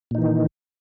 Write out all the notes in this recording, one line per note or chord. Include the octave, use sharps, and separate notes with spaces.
A#2 D#3 E3 D#4